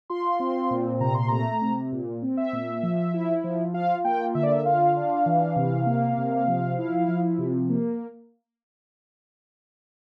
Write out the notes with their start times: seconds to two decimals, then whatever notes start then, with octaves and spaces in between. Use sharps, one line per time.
0.10 F4 C6
0.40 C4
0.71 A#2
1.00 C3 A#5
1.15 C6
1.28 A3 A#5
1.62 C3
1.92 A#2
2.22 C4
2.37 E5
2.53 A#2
2.83 F3
3.14 E4
3.44 F3
3.74 F4 F5
4.04 A#3 G5
4.35 D3 E5
4.43 D5
4.52 E5
4.65 F4 F5
4.96 D4
5.26 E3
5.56 C3
5.86 A#3
6.18 C3
6.48 F3
6.79 E4
7.08 F3
7.39 C3
7.69 A#3